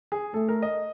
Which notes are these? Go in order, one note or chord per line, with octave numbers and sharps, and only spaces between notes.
G#4
A3 A4
A#4
D#5